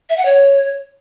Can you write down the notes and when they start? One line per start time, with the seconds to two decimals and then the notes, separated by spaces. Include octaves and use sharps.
0.10 E5
0.18 F#5
0.25 C#5